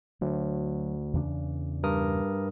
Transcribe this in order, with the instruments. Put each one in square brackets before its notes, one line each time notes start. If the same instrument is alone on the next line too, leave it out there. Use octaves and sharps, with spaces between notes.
[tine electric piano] D2 [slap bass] F#3
[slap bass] E2 C#3 D4
[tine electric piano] G2 A#4 D#6